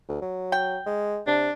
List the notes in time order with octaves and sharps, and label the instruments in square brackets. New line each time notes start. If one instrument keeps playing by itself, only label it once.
[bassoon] D2
F#3
[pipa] G5
[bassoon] G#3
[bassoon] C3 [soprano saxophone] D4